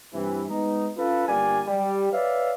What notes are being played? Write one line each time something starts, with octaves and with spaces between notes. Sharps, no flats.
G2 C3 E3
G#3 B3 D#4
C#4 F4 A4 B4
G1 G3 A#3 D5 G#5
G3
B4 C#5 D5 E5 F5